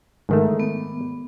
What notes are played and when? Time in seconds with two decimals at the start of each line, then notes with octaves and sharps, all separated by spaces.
0.29 G#2 D#3 A3
0.60 B3